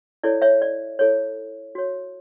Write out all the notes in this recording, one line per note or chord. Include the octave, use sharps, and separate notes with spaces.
E4 A4 C#5 D5
C#5 E5
D5
E4 A4 C#5
F#4 C#5